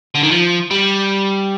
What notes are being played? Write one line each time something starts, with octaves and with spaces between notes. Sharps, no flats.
D3
D#3
F3
G3